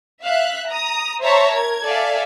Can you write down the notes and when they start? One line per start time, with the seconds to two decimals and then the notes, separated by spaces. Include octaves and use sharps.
0.21 E5 F5 F#6
0.67 A#5 D#6
1.21 C5 C#5 E5 A5 A#5 C#6
1.53 A#4 G#6
1.85 A4 D5 E5 F5 G#5